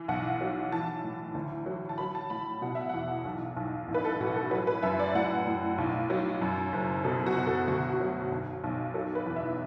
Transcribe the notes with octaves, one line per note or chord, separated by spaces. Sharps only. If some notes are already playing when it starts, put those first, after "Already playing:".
Already playing: E3
B1 F#5
F#3
E3 A5
A2
D2
F#3
A5
F#3 B5
A5
A2 B5
B2 F#5
E5
E2 F#5
B1
B1
A1
B4
A4
A1 F#4
A4
F#3 B4
B4
F#2 E5
D5
A2 F#5
A2
B1
F#3
F#2
F#1
B2 A4
F#4
B2
A4
D2 F#4
F#4
F#3
B1
B1
F#3 A4
B4
E2
E5